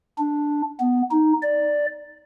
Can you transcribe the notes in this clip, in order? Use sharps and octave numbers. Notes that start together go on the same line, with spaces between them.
D4
B3
D#4
D5